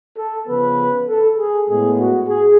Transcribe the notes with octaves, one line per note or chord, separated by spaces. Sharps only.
A4
C#3 F3 B3 B4
A4
G#4
A2 G#3 B3 G#4
F#4
G#4